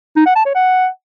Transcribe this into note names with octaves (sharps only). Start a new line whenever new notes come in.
D#4
F#5
A5
C#5
F#5